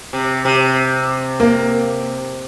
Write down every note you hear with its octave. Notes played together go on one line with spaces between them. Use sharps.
C3
C3
A#3